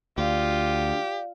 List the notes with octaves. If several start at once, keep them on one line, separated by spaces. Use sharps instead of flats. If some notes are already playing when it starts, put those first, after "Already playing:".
D2 F4 G4 D5 F5